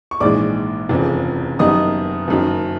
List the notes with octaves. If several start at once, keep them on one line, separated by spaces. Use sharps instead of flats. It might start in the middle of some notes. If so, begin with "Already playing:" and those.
C#6
A#1 G#2 E3 G#3 D5 D6
F1 E2 C#3 F3
F#1 F#2 D#3 G3 B3 D#5 D#6
F#1 F#2 D#3 F#3